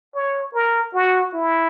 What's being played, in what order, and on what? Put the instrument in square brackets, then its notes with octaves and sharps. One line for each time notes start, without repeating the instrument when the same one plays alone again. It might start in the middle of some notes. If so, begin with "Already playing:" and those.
[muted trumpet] C#5
A#4
F#4
E4